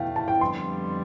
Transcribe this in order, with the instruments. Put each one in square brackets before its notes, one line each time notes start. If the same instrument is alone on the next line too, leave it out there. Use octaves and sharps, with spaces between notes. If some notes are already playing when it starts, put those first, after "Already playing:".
Already playing: [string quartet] E2 B2 A3 [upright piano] F5 G5
[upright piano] A5
G5
[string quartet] F2 D3 G3 B3 [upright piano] C6